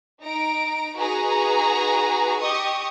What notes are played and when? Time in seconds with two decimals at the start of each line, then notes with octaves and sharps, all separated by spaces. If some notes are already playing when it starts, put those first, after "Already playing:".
0.21 D#4 A#5 D7
0.96 D#4 F#4 G#4 B4 A#5
2.41 G4 D#5 C#6 D#6